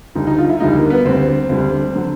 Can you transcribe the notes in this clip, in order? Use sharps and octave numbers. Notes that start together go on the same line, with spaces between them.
D2 D3 G3 D#4
D#4
F4
E4
D2 D3 G3 D#4
A#3
B3
D2 D3 G3 C4
D2 D3 G3
D3 F#3